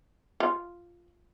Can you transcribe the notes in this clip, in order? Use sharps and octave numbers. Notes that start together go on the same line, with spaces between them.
F4